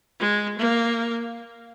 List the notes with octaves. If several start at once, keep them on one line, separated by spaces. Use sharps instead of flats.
G#3
A#3